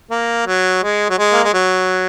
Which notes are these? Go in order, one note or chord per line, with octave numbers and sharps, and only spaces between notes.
A#3
F#3
G#3
F#3
G#3
A#3
G#3
F#3